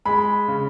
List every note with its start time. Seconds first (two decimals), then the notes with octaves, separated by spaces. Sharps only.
0.05 G#3 B5
0.48 C#3